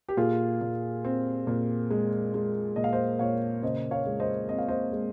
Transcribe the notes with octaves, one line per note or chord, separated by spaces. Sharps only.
G4
A#2 F4 G#4
A#2
C4
A#2
G#3
G#3
A#2 D#5
F5
C5 D#5
A#2 C#5 F5
C#3 C5 D#5
C#5 F5
G#3
C5 D#5
C4 D#5
F5
C5 D#5
G#3